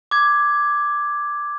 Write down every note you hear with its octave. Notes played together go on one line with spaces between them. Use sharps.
D6 G#6